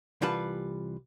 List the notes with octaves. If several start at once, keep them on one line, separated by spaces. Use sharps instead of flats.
C2 E3 G3 F4 B4 A5